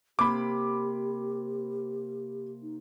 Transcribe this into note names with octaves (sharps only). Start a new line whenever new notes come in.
C3 A#3 G4 B5 D6
D#4